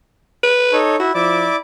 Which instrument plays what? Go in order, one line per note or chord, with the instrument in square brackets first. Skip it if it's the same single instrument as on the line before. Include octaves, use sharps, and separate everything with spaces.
[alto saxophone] B4
[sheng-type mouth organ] D#4 A4 C#5
[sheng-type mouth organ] E4 [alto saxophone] F#4
[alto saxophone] F3 [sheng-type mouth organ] E4 D5 D6